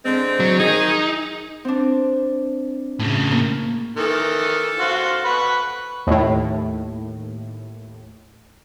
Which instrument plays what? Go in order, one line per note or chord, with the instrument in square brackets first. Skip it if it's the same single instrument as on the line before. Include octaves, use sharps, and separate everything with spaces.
[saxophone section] D3 G#3 C4
[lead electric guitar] F#3
[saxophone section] D#3 G#4 [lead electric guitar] D#4
[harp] C4 D4
[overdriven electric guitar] A2 C#3
[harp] A#3
[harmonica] D#3 E3 A#4 [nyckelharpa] A4
[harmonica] F#4 C5 F5
B4 F#5 C#6
[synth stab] D#2 A2